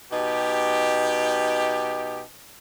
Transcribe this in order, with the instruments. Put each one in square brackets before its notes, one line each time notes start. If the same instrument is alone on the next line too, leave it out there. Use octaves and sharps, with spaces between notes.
[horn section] B2 D#4 G4